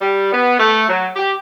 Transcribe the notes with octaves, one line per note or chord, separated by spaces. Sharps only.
G3
B3
A3
F#3
G4